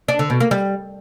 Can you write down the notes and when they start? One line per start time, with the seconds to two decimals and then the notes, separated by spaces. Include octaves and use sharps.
0.08 D4
0.19 D3
0.30 B2
0.40 A#3
0.51 G3